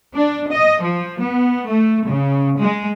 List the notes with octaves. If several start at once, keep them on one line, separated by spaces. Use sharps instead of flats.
D4
D#5
F3
B3
A3
C#3
G#3